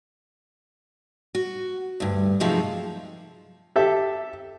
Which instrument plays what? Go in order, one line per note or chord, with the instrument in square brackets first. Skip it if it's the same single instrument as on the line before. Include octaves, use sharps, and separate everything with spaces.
[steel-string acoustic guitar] F#4
D2 G2
C3 F3 F#3 G#3 A3 D#4
[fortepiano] G4 A4 E5